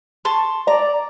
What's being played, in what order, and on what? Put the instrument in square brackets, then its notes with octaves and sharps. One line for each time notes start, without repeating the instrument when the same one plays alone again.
[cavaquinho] A5 C6 C#6
[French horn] D5 [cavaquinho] A#5